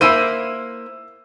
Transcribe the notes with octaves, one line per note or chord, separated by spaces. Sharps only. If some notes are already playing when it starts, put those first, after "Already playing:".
A#3 E4 C5 E6 D#7